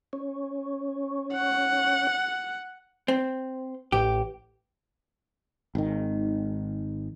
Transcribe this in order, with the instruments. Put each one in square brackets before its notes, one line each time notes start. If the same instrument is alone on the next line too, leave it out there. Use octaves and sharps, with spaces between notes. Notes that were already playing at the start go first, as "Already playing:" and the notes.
[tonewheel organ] C#4
[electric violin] F#5
[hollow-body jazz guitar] C4
[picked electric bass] A1 [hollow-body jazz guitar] G4
[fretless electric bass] G#1 D#3